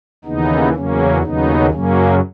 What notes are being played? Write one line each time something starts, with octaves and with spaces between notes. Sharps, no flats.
D#2 C#3 E3 B3 D#4
E2 C#3 F#3 A#3 C#4
D#2 C#3 F#3 B3 D#4
F#2 C#3 F#3 A#3 C#4